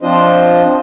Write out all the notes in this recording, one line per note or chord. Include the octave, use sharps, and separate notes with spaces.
F3 C4 D4 F4 C5 D#5